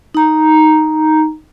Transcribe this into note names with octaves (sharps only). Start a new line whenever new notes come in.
D#4 A#5